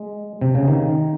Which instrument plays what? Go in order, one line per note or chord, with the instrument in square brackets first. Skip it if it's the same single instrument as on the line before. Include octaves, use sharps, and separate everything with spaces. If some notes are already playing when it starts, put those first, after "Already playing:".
Already playing: [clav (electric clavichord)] G#3
C3
C#3
D#3